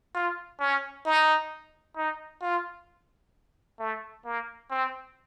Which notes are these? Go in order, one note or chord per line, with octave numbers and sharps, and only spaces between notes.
F4
C#4
D#4
D#4
F4
A3
A#3
C4